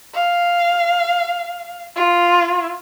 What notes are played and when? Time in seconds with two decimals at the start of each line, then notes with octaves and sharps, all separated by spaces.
0.15 F5
1.96 F4